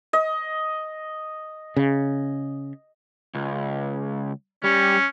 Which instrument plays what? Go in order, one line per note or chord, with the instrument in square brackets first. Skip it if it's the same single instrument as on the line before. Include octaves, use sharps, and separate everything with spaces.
[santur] D#5
[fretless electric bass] C#3
[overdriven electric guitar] C#2
[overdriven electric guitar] G3 [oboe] C#4